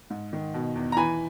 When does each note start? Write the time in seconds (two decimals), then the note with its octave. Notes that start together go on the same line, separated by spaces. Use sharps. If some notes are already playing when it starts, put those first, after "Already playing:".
0.10 G#2
0.33 D#3
0.54 B2
0.76 E2
0.92 A#5
0.96 E3 G#5 B5